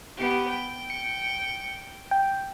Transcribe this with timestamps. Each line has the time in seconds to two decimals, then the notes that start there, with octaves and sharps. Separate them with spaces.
0.16 B3 G4
0.47 G5
0.90 C#7
2.11 G5